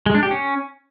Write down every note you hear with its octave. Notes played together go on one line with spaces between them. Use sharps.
G#3
D4
G4
C#4